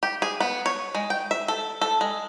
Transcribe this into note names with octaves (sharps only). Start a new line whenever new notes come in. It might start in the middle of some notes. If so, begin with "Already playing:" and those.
G4
G#4
B3
C#5
G#3
G5
E5
A4
A4
G#3